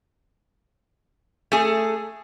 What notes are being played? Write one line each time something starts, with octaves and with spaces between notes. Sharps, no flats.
A3 G#4